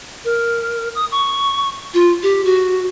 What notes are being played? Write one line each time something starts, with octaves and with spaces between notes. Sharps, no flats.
A#4
D#6
C#6
F4
G4
F#4